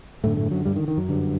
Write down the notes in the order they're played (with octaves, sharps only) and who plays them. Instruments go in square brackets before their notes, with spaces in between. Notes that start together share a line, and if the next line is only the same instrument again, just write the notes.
[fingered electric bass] F#2 A2 D3 A3
A2 A3
F#2 F#3
G2 G3
D#3
D#3
F#2 F#3
G2 D3